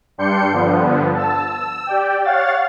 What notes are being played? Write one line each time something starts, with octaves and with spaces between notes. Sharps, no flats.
G2 G3 D4 C6 G6 C#7
G2 D3 F3 B3
A5 E6
E6
G4 D5 G5
C#5 F5 F#5 A6